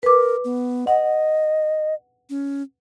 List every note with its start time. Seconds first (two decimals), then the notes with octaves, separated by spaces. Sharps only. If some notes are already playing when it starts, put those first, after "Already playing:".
0.03 A#4 B4 D6
0.45 B3
0.87 D#5 F#5
2.30 C#4